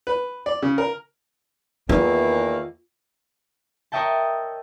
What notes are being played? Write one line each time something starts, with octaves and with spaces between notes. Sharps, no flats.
B4
D5
C#3
A#4
E2 D#3 A3 A#3 F4
A#4 C#5 D#5 E5 G5 A5